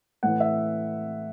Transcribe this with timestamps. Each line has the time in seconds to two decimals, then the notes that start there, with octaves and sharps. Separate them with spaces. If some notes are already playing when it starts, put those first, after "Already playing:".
0.23 A2 E3 F#5
0.40 E5